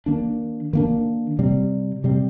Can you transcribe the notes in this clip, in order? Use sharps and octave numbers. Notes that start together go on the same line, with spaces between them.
D#3 A#3 D4
D#3 A#3 D4
C3 G3 C4
C3 G3 C4